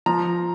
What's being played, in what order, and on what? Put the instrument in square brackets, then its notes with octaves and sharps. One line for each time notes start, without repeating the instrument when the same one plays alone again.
[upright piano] F3 A#5